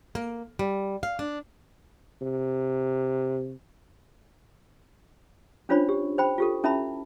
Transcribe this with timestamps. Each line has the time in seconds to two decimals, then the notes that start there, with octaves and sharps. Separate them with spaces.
0.15 A#3
0.59 G3
1.03 F5
1.19 D4
2.21 C3
5.69 C#4 D4 F4 C5 C#5 B5
5.89 G4
6.18 C5 G5 B5
6.38 F4 G4 A4
6.64 C#4 E4 E5 A5 B5